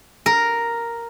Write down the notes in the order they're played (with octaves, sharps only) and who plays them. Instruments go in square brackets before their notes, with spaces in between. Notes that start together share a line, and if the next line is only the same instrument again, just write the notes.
[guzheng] A#4